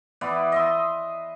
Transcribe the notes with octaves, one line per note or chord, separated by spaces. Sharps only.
E3 B3 D5
D#5 E5 C6